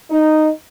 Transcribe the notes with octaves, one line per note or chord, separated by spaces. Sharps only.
D#4